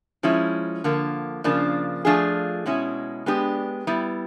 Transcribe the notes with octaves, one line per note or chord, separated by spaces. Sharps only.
F3 G#3 C#4 E4
D3 F3 A#3
C#3 F3 A#3 D4
F3 A3 D4 F4 G#4
B2 G#3 C#4 E4
G#3 B3 D4 G4
G3 B3 E4